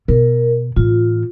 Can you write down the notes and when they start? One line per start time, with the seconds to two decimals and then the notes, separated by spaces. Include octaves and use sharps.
0.08 B2 A#4
0.76 A2 E3 F4